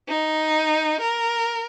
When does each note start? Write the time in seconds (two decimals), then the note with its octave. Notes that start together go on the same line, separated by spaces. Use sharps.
0.09 D#4
1.01 A#4